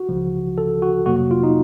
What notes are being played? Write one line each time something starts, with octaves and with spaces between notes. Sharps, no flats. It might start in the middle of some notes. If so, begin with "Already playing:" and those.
Already playing: F#4
C#2 C#3 F3
A4
F#4
F2 C3 F#3 A#3 F#4
F4
D#4